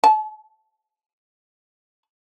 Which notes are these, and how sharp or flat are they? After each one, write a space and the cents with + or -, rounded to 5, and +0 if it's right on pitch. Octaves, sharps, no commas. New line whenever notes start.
A5 -45